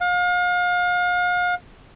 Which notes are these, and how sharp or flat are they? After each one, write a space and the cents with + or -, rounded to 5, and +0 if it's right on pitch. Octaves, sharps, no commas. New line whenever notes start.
F5 +40